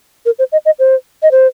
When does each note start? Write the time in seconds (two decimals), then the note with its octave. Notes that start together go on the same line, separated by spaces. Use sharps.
0.26 A#4
0.39 C5
0.52 D#5
0.66 D#5
0.79 C5
1.23 D#5
1.31 C5